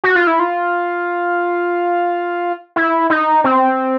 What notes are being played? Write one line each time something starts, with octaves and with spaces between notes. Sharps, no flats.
F#4
F4
E4
F4
E4
D#4
C4